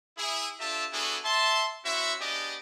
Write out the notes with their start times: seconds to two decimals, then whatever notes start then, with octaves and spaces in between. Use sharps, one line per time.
0.18 E4 G#4
0.60 D4 F4 G4 A4 E5 A5
0.93 B3 D4 E4 F#4 G#4 A4
1.24 E5 A5 C6
1.85 C#4 E4 F#4 C5 E5
2.21 B3 D4 G4 G#4 D5 D#5